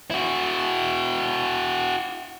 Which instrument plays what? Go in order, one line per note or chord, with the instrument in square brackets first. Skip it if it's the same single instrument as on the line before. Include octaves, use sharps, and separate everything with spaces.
[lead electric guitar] E4 F#4